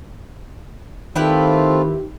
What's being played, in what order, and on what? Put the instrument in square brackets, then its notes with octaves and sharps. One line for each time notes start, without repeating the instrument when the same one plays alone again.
[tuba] D#3 [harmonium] A3 C4 F4 [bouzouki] E4 G4 B4